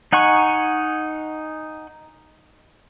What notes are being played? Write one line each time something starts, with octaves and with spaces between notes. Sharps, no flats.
D#4 F#5 G#5 C#6